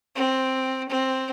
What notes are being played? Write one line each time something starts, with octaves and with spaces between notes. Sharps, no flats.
C4
C4